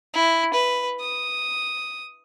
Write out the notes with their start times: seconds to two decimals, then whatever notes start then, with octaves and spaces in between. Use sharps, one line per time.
0.14 E4
0.54 B4
1.00 D#6